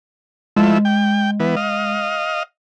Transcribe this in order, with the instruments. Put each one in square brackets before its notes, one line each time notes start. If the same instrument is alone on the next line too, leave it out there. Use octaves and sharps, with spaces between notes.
[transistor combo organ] F3 A3 E4 [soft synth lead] G#3
[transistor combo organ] G5
E3 B3
D#5 F5